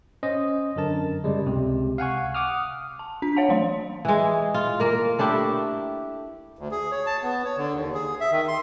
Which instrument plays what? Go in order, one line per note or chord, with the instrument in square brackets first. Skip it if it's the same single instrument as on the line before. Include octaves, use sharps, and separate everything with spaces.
[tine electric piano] C#4 C5 D#5
F#2 D3 A#4 A5
C#3 G3 G#3
C#2 C3
F5 F#5 G#5 C#6
F#5 D6 D#6 F6
[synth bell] A5
D4 B6
C#5 F5 F#5 A5
E3 F#3 A3 F5 C6
[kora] E3 G#3
F4
A#3 A#4
A3 D4 E4 G4
[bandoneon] D2
G#4
C#5
A5
B3
C#5
D3
D#2
G#4
E5
D#3
C6